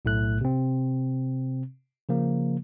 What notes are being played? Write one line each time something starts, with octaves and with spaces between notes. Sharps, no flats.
B1 A2 A3 F#6
C3 C4
C#3 F3 A#3